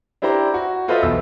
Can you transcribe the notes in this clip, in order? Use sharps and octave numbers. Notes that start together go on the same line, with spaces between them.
D4 E4 G4 C5 A#5
F#4
F4 A4 B4 C5 D#5 E5
B1 E2 E6